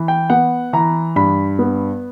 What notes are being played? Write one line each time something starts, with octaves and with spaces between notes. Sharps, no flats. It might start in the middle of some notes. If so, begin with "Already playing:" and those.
Already playing: E3
G5
B3 F#5
E3 A#5
G2 B5
B3